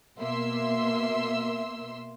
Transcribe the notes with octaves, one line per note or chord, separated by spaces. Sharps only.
B2 A#3 E5 C6 E6